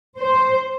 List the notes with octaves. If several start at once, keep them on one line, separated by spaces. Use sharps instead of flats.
C5